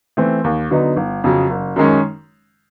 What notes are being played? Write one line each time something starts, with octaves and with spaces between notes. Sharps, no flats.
E3 A3 C4
D#2
D3 F#3 B3 D#4
G1
F2 C#3 F#3
F#1
F#2 D#3 G#3 C#4